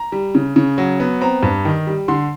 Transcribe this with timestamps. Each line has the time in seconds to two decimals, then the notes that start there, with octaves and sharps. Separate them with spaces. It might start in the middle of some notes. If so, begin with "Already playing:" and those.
Already playing: A#5
0.12 G3
0.35 C#3
0.56 C#3
0.78 F#3
1.00 B3
1.21 C4 A#5
1.43 G2
1.65 D#3
1.87 G3
2.08 D3 C6